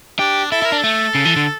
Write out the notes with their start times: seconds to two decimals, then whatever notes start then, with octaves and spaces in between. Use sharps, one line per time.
0.19 D4 G4
0.51 E4 A4
0.62 E4
0.65 A#4
0.72 D4
0.79 A3 A4
1.15 C#3
1.25 E3
1.36 D3